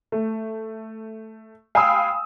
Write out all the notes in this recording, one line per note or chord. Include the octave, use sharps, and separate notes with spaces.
A3
F5 G5 G#5 B5 D#6 E6